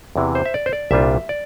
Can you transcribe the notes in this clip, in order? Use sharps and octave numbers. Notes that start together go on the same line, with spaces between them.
E2 C3 E3
C5
E5
D5
C5
D5
C2 A#2 G3 D4 F4 E5
D5